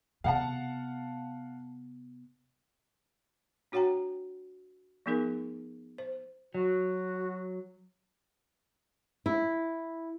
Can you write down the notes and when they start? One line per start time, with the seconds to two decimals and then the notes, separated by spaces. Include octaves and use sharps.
0.24 C3 B3 F5 F#5 A5
3.72 D4 F#4 C#5 F#5 G5 A#5
5.06 F3 A3 B3 D#4 G#4 A#4
5.98 C5
6.55 F#3 F#4
9.26 E4